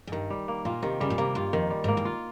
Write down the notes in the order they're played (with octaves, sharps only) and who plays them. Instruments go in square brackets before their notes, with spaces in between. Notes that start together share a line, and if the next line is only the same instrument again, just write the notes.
[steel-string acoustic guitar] G#2
[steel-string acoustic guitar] G2 [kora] D#3
[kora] G3
A#3
[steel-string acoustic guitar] A#2 [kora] F4
[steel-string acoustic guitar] C3 [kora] D#3
[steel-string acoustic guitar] C#3 [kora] G3
[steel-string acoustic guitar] A#2
[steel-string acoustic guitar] C3 [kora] A#3
[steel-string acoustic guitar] G2 [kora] F4
[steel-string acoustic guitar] F2 [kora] D#3
[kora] G3
[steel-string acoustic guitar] G#2
[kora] A#3
[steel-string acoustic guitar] G#2
[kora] F4